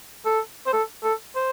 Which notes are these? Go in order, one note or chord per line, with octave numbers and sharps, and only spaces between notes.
A4
C5
A4
A4
C5